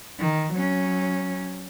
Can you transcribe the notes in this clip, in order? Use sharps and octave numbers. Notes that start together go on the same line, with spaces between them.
D#3
F#3 C#4